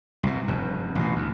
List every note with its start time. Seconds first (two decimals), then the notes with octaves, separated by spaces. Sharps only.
0.23 C2 B2
0.48 F1 G2
0.95 A1 B2
1.16 D2